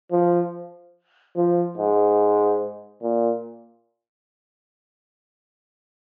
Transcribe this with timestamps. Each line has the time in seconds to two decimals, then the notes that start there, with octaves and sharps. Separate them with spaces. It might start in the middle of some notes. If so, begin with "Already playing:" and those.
0.12 F3
1.36 F3
1.78 G#2
3.03 A#2